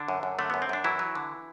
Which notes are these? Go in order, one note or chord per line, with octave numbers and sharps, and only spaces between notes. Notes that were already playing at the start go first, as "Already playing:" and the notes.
Already playing: D3 D4
F#2
F#2
D3 A3
F#2 B3
C4
F#2 D4
E3 F#3 E4
F#3
D3